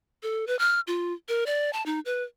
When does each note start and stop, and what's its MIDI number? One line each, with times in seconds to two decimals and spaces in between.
0.23 0.45 69
0.47 0.58 71
0.59 0.80 89
0.87 1.13 65
1.28 1.44 70
1.46 1.72 74
1.73 1.83 81
1.86 2.00 63
2.05 2.23 71